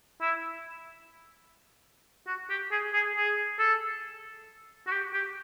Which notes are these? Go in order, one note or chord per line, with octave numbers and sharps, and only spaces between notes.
E4
F#4
G4
G#4
G#4
G#4
A4
F#4
G4
G4